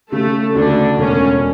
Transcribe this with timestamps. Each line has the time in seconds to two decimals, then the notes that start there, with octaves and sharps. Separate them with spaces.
0.12 C#3 A3 A4
0.55 D2 D3 D4
0.98 E1 C#4